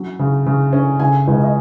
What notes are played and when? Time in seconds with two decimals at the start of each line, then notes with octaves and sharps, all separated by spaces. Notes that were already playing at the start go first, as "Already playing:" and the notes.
Already playing: F#3 C#4
0.19 C#3
0.46 C#3
0.73 C#4
1.00 C#3 G#5
1.28 C#2
1.43 D#5